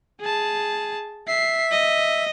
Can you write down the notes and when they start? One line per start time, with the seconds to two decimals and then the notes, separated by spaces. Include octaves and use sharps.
0.21 G#4 A5
1.28 E5 C7
1.72 D#5